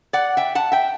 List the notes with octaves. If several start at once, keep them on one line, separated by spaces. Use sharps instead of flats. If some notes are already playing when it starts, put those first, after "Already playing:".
D5 F#5
E5 G5
F#5 A5
E5 G5